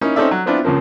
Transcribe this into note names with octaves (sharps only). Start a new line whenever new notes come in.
A#3 C#4 D#4 E4
C4 C#4 D#4 A4 D5 E5
F#3
B3 C4 D4 E4 F4
C#2 C#3 F3 A#3 C4